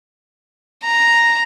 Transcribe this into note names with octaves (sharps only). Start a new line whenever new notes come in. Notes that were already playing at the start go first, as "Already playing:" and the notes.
A#5